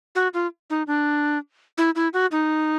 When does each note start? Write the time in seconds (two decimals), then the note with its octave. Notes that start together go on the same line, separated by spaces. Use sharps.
0.15 F#4
0.34 F4
0.70 D#4
0.87 D4
1.78 E4
1.95 E4
2.14 F#4
2.32 D#4